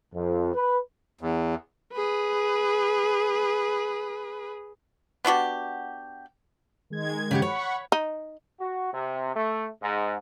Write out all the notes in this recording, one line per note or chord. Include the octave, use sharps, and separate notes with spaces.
F2
B4
E2
G#4 B4
B3 D4 F#4 G4
D#3 G#3 G#6
C#3 G4 F#5
C#5 F#5 B5 C#6
D#4
F#4
C3
A3
G#2